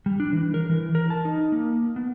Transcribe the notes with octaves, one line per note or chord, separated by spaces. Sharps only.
G3
D4
E3
A#4
E3
A#4
A5
D#4
A#3
B3